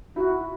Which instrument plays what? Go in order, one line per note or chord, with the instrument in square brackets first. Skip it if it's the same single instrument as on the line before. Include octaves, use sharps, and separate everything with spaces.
[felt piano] E4 [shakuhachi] F#4